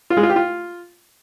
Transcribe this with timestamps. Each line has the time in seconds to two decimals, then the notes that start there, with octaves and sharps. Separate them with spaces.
0.10 F4
0.17 G#3
0.23 F4
0.30 G4
0.36 F4